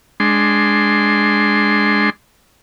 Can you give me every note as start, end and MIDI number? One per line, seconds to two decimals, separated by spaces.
0.20 2.10 56
0.20 2.10 62
0.20 2.10 84